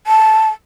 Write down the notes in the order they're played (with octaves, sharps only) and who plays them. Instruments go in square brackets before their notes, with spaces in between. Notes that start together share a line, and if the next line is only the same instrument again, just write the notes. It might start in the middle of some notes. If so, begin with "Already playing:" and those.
[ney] A5